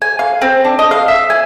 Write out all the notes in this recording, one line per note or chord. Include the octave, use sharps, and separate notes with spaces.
G#5
F5
C4
D4
D#5
F5
E5
G#5